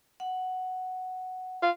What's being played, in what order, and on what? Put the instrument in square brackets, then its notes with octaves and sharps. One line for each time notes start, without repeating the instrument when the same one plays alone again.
[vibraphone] F#5
[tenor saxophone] F4